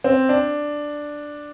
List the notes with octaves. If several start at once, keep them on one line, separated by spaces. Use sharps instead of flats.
C4
D4